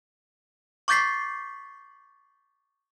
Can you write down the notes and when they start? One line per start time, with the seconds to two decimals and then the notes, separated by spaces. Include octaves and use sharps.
0.88 C#6 D6 G6 A6 B6 C7